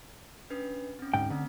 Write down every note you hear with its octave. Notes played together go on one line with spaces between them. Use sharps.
C#4 D4 B4
C4 C#4
D2 G#2 G5
D3 A3 C4 D4